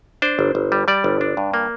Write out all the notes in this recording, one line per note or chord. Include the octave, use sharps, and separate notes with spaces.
D4 C5
G1
G1
G3
G3 D5
G1
D4
G2
A#3